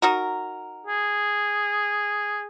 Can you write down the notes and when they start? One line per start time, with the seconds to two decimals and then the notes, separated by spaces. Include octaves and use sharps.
0.02 D#4 F#4 A#4
0.87 G#4